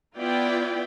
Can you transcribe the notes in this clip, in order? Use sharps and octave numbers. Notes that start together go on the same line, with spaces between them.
B3 E4 F4 D5 G5